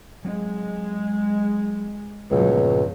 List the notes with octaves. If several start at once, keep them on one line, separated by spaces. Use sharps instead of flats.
F#3 G#3 C4
G1 C#2 A#2 C#3 F3 F#3 G#3